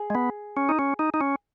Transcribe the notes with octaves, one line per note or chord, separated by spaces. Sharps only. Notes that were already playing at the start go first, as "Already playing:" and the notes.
Already playing: G#4
G#3
B3
C#4
D#4
C#4
D#4
D#4
C#4